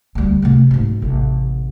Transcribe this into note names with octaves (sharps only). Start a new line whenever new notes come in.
D2 G3
C3 A3
G#2 B2
A1 C3